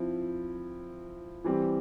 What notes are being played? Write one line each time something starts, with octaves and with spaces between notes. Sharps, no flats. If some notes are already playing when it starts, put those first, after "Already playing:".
Already playing: F3 C4 E4
E3 G3 C4 G4